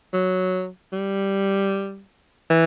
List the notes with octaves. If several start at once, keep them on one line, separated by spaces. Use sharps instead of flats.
F#3
G3
E3